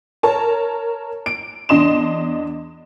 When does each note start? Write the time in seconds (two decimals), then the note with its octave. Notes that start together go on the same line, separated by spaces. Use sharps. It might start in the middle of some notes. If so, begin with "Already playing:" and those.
0.23 A#4 C#5 A5
1.26 D7
1.69 E2 D4 D#5 C6 E7